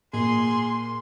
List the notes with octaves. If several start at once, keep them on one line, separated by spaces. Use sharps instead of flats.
A#2 G#4 C6